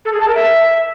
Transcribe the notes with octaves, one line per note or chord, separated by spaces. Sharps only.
A4
G#4
A5
A#4
E5